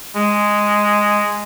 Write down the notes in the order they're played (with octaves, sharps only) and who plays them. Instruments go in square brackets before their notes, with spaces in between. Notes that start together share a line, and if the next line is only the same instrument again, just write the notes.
[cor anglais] G#3